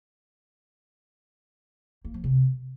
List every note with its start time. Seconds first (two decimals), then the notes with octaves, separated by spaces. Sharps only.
2.05 A#3
2.14 F3
2.24 C3